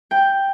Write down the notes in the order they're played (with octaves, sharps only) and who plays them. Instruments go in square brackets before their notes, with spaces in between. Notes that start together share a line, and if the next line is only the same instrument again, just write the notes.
[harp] G5